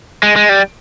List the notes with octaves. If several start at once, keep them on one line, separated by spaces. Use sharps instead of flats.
G#3
G#3
G3